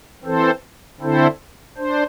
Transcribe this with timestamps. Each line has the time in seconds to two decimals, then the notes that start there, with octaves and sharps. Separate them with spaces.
0.23 E3 C4 A4 C5
1.00 D3 C4 E4 A4 C5
1.77 D4 C5